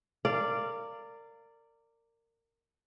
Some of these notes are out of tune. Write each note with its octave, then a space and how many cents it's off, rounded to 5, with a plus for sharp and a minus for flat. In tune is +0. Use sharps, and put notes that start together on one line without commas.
A#4 -25 D5 +0 F5 -15